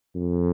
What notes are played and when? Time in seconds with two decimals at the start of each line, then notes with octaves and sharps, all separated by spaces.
0.15 F2